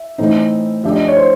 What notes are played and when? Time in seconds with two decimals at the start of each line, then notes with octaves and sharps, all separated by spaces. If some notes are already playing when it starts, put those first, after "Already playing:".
Already playing: E5
0.18 A2 E3 A3 C4 D#4
0.83 F3 A3 D4 G4 E5
0.92 D#5
1.00 D5
1.08 C#5
1.17 C5